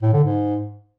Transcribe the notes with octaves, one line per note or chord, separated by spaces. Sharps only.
A2
D3
G#2